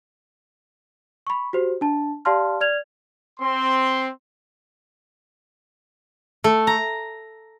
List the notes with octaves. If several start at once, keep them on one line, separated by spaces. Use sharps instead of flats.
B5 C#6
F#4 G4 C5
D4 A5
G4 D5 F5 A5 C6 F6
D5 F6 G#6 F7
C4 C6
A3
A#5